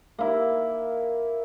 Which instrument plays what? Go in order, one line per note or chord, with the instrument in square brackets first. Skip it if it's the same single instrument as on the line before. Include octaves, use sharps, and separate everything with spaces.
[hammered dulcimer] A#3 E4